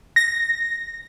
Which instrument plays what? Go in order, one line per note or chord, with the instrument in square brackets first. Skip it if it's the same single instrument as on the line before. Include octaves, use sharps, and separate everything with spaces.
[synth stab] A#6